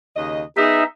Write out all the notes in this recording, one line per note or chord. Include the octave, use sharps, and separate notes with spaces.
D#2 C#3 D#5
B3 D#4 G#4 E5